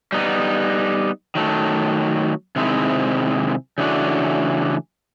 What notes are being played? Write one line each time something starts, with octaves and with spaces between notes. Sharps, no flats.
G3 B3 D#4
D#3 F#3 A3
C3 D#3 G#3 C4 E4
C#3 E3 A3 D4 F#4